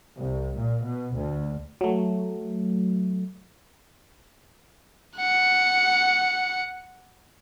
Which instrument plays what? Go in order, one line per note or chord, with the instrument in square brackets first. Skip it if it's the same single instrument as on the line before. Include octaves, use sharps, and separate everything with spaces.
[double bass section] C2
A#2
B2
D2
[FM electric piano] F#3 A3
[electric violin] F#5 C#7